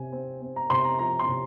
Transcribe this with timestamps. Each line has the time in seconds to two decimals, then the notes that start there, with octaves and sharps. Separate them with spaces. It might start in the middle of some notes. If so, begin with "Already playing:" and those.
Already playing: C3 G#5
0.12 C4
0.42 C4
0.56 A#5
0.70 C3 C6
0.84 A#5
0.99 F3 A#5
1.19 C6
1.28 C3